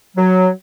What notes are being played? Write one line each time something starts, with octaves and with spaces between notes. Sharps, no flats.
F#3